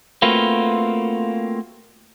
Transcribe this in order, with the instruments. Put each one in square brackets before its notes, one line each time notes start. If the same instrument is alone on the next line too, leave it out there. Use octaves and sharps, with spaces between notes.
[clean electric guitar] A3 A#3 C4 F4 F#4 B4